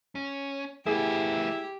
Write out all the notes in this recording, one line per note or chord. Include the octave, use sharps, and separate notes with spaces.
C#4
A3 B3 E4 G4 G#4